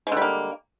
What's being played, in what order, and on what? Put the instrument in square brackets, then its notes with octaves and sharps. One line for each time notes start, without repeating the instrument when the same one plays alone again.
[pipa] G#3
D3
G3
A#3